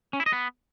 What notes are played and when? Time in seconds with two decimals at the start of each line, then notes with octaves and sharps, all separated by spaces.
0.13 C#4
0.20 E4
0.26 D#5
0.33 B3